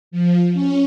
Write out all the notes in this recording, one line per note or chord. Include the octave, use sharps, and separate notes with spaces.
F3
C#4